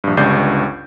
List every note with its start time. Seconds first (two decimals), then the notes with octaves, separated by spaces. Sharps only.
0.04 A#1 G2
0.17 G1 C#2 G2 D5 G6 C7